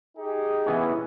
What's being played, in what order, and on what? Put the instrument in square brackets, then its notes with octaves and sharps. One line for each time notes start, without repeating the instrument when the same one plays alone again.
[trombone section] D#4 G4 G#4
[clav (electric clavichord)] E3 B3 C#4 [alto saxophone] E4